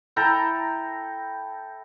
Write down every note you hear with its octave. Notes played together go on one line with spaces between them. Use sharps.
E4 A4 G5 A#5